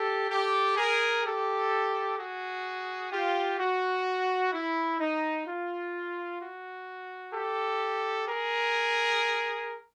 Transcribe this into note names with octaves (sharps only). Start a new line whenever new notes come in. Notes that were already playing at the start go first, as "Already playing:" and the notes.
Already playing: G4 A4
G4 A4
G#4 A#4
G4 A4
F#4 G#4
F4 G4
F#4
E4
D#4
F4
F#4
G4 A4
G#4 A#4